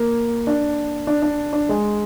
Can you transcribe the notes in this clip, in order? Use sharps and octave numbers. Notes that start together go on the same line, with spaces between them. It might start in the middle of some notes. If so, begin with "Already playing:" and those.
Already playing: A#3
D4
D4
D4
D4
G#3